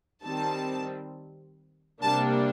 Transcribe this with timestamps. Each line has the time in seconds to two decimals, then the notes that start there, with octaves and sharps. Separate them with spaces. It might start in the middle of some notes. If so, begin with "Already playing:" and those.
0.24 D#3 G3 C4 A5
2.02 C3 G3 A#3 D4 A5